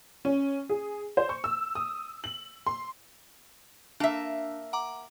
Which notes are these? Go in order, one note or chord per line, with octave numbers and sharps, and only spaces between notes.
C#4
G#4
C5
C#6
E6
D#6
F#7
C6
A#3 D4 E5 A5
F#5 A#5 D6